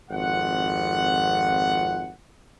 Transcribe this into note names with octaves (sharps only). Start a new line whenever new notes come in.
G#1 F2 F4 F#5